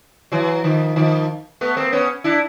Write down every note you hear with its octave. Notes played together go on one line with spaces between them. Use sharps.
E3 F#3
D#3 F3
D#3 F3
A3 B3
A#3 C4
B3 C#4
D4 E4